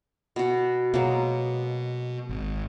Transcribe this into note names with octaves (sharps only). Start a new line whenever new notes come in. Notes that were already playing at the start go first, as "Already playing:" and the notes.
B2 F#4
B2 F#3 G#3 A#3
G#1